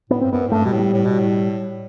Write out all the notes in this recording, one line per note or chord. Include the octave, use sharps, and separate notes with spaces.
A2 B3
G2 C4
F#2 B3
A2
G2 A3
B2 G3
A2
G3
A2
B2
A2